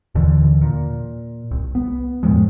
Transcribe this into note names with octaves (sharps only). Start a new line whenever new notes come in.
D#2 A#2 D3 E3
A#2
C2
B3
F2 A2 F3 G#3